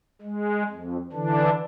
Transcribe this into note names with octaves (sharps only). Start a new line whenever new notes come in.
G#3
F2
D3 E3 D4